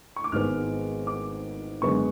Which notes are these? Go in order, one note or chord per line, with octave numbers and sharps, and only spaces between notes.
C#6
D6
G#1 G#2 G#3 B3 F6
D6
F#2 D3 G#3 B3 C#6